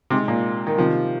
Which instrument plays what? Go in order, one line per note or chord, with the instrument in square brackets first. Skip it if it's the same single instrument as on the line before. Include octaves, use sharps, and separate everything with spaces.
[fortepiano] C3 [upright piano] G#3 D#4 G#4
[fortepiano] A#2
D#3
[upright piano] C3 D#3 G3 [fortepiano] F3